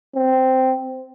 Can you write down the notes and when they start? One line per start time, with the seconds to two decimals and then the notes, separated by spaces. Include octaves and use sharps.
0.15 C4